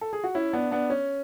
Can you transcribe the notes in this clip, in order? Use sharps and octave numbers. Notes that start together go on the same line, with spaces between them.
A4
G#4
F#4
C#4 E4
B3 D4
B3 D4
C#4